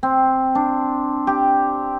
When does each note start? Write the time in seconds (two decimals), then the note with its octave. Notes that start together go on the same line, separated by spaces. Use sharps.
0.03 C4
0.55 D4
1.27 G4